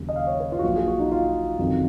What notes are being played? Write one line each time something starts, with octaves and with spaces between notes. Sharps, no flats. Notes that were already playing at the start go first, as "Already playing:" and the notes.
Already playing: D#2 C#3 F#3
D#5
F5
C#5
B4
F4
F#4
A#1 A#2 F#3 F4
G#4
F#4
D#4
F4
F#1 F2 D#3 F#3